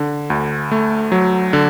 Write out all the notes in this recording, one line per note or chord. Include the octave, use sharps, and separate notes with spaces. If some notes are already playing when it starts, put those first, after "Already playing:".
Already playing: D3
D2
A3
F#3
D3